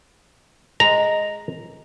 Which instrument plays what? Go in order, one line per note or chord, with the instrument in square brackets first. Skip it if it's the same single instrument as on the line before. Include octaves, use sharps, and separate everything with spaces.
[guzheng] G#3 [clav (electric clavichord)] A#5